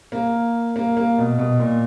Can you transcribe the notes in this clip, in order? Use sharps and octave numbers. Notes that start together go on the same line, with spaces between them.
A#3
A#3
A#3
B2
B2
A#2